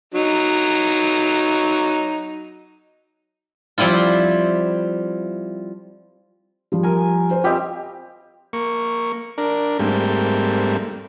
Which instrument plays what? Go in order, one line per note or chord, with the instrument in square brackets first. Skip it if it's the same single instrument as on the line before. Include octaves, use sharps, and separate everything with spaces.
[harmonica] F#3 D#4
[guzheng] F3 G3 C4 E4 F4
[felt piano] F3 G3
[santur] A#4 G#5
[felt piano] C5
[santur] G3 C4 G4 [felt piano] F4 D#5
[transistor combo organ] A#3 C#6
D4 A#4
G#2 G3 A3 A#3 C4